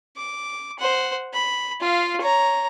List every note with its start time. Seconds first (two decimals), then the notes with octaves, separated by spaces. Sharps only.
0.17 D6
0.79 C5 F#5
1.33 B5
1.81 F4 F5
2.21 C#5 A#5